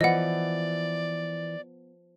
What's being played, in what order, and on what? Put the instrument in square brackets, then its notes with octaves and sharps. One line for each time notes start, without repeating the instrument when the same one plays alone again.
[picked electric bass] E3 [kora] F3 B3 [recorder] D5 [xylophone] D#5 F#5